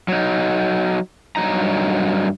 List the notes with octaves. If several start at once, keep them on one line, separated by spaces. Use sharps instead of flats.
F#3 D#4
G2 A#2 F#3 D#4 A#5